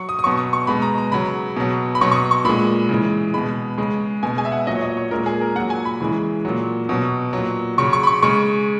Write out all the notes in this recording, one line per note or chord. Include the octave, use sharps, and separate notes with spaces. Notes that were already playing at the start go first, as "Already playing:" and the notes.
Already playing: F#3 C#6
D#6
D#6
B2 F#3 C#6
D#6
C#6
B2 G#3 B5
A#5
A#5
C#3 F#3 B5
B2 F#3
B5
B2 F#3 C#6
C#6
D#6
C#6
A#2 G#3 B5
C#3 E3 G#3
B2 G#3 B5
C#3 G#3
B2 G#3 G#5
G#5
E5
F#5
A#2 F#3 D#5
C#5
D#5
C#5
A#2 G#3 A#4
G#4
A#4
A#2 F#3 F#5
G#5
B5
C#3 E3 G#3
A#2 F#3
B2 F#3
A#2 F#3
C#3 F#3 C#6
C#6
B5
C#6
C#3 G#3 C#6